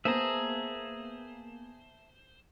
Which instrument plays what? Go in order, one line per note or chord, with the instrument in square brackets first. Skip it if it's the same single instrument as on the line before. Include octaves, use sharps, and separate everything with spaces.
[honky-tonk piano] A#3 B3 [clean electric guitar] G#4 [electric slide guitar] C5 [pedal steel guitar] E5 A5 A#5